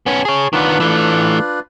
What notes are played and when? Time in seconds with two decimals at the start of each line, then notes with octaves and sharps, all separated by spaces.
0.06 B3 C#4 G#5 A5
0.25 G#4 C#5
0.53 D#3 B3 D4 F4 B4
0.80 E3 A3